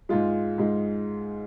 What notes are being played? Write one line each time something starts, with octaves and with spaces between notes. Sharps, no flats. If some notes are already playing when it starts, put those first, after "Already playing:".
G#2 G#3 F4
G#2 G#3